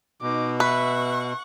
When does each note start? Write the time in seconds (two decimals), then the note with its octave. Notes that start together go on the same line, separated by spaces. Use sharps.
0.22 B2 D#4 D6
0.60 B4 E5 F#5 C#6